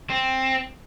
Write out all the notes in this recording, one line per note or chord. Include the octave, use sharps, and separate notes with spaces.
C4